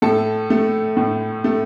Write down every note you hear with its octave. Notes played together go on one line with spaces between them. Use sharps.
A2 A4
A3
A2
A3